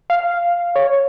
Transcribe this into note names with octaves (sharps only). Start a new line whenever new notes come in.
F5
C#5